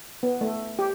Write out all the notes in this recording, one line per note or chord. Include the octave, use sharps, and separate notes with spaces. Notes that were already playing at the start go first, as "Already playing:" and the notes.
B3
A3
G4